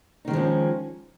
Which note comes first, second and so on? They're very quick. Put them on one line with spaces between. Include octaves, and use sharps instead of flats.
D#4 D#3 G#3 F3 C#4